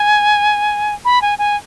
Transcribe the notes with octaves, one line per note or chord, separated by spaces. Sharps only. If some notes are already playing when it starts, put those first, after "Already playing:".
Already playing: G#5
B5
G#5
G#5